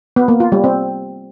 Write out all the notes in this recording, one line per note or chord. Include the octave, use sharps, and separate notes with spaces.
B3
A#3
F4
G3
C4